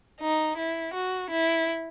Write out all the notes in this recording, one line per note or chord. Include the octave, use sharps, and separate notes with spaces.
D#4
E4
F#4
E4